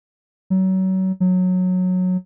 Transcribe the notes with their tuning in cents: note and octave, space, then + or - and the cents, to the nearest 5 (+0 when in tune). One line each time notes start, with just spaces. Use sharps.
F#3 +30
F#3 -15